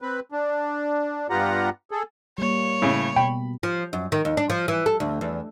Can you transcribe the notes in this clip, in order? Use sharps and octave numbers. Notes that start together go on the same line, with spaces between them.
C4 B4
D4
G2 B3 F4 G4 F#5 A#5
G#4 A4
G3 A#3 C#5
A2 C#3
B2 G5 B5
F3
F#2
D#3
D#2
D4
F3
E3
A4
D2
E2